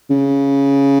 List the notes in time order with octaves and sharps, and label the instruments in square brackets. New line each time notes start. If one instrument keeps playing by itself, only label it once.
[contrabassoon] C#3